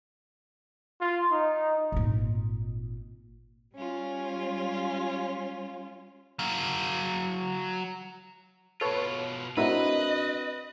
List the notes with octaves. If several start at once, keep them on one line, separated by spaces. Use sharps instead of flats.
F4
D#4
G#1 A#2
G3 C#4 F4
F#3 F5
B2 F4 A4 B4 C#5
A2 C4 D4 E4 F#4 A#4 B4 D#5